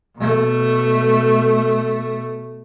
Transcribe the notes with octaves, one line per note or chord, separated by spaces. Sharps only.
B2 A3